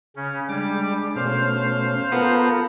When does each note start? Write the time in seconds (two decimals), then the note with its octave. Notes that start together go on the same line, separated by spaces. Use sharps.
0.16 C#3 C#4
0.49 G3 G#3 D4 D6
1.16 B2 A3 C#4 C5 F5
2.12 B3 F4 A4 A#4